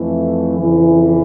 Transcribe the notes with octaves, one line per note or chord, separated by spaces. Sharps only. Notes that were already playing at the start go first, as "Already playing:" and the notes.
Already playing: F2 E3 A3
F2 C#3 E3